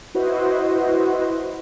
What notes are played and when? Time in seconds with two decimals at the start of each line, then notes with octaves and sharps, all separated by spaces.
0.15 E4 F#4 B4 C5 D#5